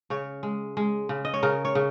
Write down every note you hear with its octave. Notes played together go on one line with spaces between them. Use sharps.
C#3 C#5
G#3
G#3
C#3
D#5
C#5
C#3 A#4
C#5
C#3